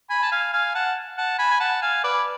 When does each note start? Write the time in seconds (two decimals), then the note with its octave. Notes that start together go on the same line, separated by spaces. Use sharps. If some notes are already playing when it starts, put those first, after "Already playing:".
0.10 G#5 B5
0.22 A5
0.31 F5 G#5
0.53 F5 G#5
0.75 F#5 A5
1.17 F#5 A5
1.39 G#5 B5
1.50 G#5
1.60 F#5 A5
1.82 F5 G#5
2.04 B4 D5